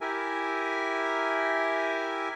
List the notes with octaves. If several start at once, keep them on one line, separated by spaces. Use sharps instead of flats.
E4 G4 A#4 E5 G#5